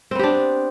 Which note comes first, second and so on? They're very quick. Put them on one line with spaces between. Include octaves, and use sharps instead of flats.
C4 B3 G4 D4